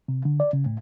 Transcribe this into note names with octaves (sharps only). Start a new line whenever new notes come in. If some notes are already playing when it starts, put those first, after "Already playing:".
C3
D3
D5
C#3
A2